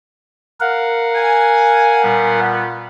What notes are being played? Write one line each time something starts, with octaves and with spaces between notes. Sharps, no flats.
A#4 F5 F#5
G#5
A#2 G3 B3